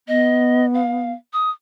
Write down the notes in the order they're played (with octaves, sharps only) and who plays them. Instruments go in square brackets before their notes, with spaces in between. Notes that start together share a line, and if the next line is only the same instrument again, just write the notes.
[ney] B3 [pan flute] D#5
[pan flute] F5
D#6